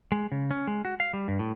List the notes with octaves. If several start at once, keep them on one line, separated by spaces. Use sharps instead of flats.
G#3
C#3
C#4
G#3
F#4
F5
G3
G2
A2